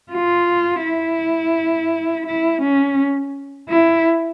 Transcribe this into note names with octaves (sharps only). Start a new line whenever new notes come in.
F4
E4
E4
C#4
E4